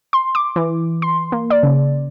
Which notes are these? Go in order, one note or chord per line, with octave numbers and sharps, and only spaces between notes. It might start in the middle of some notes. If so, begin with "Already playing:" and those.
C6
D6
E3
C6
A#3
D5
C#3